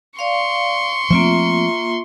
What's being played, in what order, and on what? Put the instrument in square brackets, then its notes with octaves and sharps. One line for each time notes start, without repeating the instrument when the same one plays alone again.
[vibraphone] D5 F5 [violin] C6 C#6
[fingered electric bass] F3 A3 C4 [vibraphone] A#3 F4 E5